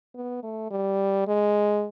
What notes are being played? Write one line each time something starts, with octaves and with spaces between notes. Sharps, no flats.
B3
A3
G3
G#3